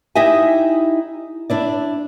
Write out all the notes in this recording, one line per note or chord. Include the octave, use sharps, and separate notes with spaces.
D#4 E4 G4 D#5 E5 G#5
D4 E4 D5